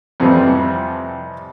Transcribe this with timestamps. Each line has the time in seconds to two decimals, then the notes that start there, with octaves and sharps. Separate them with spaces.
0.20 F2 C3 E3 F3 G3